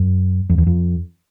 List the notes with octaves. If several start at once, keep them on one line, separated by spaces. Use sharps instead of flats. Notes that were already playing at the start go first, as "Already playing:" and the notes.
Already playing: F#2
F2
E2
F2